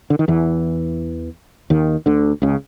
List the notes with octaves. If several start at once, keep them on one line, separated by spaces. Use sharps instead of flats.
D3
D#3
E2 E3
D#2 D#3
D2 D3
C#2 C#3